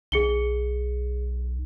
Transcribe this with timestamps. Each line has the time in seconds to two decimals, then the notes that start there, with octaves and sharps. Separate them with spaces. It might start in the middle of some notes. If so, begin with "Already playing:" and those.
0.12 B1 G#4 C#7 G7